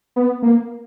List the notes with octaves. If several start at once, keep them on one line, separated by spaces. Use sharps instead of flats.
B3
A#3